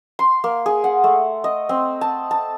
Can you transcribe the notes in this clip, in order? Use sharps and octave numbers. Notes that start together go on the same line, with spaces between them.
C6
A#3
G#4
F#5
A3
D#5
C4
A5
A5